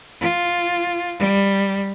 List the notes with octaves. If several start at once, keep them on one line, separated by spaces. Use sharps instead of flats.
F4
G3